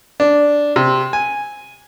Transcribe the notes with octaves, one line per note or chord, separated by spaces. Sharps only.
D4
C3
G#5